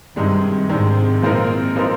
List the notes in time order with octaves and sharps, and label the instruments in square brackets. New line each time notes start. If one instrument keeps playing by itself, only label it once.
[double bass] G2 [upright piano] C3 D#3 G#3 D4
[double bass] G#2 [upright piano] C3 D#3 G#3 D4
[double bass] A#2 [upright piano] F3 G#3 C4 D#4 A#4
[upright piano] F3 G#3 C4 D#4 A#4